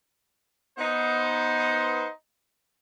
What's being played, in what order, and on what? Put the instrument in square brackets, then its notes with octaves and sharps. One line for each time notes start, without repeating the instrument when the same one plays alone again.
[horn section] B3 D#4 C5